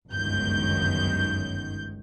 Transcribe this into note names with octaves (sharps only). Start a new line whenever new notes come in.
G1 C#2 F#2 D#3 G6